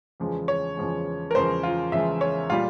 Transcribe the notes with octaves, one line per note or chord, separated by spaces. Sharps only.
E2 C#3 F3 G#3
C#5
E2 C#3 F3 G#3
A#4
E2 C#3 F3 G#3 C5
F4
E2 C#3 F3 G#3 E5
C#5
A#2 G3 F4